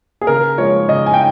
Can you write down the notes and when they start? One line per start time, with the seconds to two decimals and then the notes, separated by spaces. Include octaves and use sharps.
0.21 G#4
0.27 C#3 A#4
0.58 F3 G#3 C#5
0.89 C#3 D#5
1.06 G#5
1.14 G5